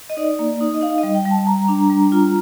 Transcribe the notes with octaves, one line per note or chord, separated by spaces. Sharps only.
D#5
D#4 D5
A#3
D#4
D#5
D#4 F5
D#5
G3
G5
G3
A5
G3 A#5
D4
G3
F4